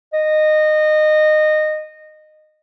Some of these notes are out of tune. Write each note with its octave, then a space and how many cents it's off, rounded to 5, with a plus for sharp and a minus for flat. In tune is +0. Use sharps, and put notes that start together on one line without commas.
D#5 -20